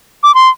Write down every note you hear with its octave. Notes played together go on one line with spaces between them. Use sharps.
D6
C6